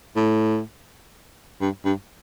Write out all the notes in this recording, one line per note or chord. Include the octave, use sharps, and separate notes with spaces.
A2
G2
G2